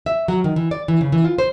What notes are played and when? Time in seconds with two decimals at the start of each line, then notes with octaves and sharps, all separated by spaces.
0.06 E5
0.28 F#3
0.44 D#3
0.56 E3
0.71 D5
0.88 E3
1.01 C#3
1.12 E3
1.24 F4
1.38 C5